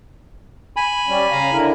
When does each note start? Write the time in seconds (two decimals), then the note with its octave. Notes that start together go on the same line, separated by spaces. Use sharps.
0.76 G#5 B5
1.08 G3 C#4
1.31 C#3 F5 A#5
1.52 D3 E4 A#4